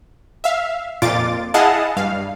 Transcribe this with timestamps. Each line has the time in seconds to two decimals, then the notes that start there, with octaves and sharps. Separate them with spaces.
0.44 E5 F5
1.02 F2 A#2 F4 D6 A6
1.54 E4 G#4 D#5 F5 F#5 A5
1.97 G2 F5